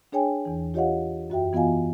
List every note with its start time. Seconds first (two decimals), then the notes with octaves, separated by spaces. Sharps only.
0.12 D4 G#4 C#5 G5 G#5
0.45 E2 E3
0.74 F4 G4 C#5 D#5 F5 F#5
1.30 F#2 F#4 E5 G5
1.53 E3 B3 F4 D#5 F5 G#5